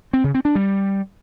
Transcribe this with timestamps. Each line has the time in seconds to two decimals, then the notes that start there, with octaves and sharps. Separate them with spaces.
0.13 C4
0.24 C#3
0.34 C4
0.45 D4
0.55 G3